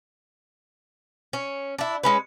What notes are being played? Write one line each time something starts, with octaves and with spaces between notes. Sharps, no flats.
C#4
D4 E4
G#3 C#4 B4